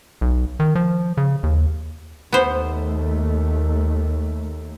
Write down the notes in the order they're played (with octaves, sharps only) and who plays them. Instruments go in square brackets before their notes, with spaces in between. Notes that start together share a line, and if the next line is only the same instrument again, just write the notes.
[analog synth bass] B1
D#3
F3
C#3
D#2
[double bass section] D#2 A3 [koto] B3 C5